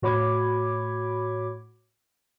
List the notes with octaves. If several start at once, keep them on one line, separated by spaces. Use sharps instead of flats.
A2 F#4 C#5 B5 D6 G#6